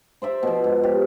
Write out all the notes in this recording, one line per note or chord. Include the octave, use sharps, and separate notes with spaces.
C5 D5 E5 A#5
B2 F3
G#2
G4